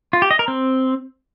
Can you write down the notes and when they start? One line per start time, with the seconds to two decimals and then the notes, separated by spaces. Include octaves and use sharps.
0.13 F4
0.22 G4
0.31 D#5
0.39 A#4
0.48 C4